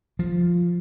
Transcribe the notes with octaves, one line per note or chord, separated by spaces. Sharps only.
F3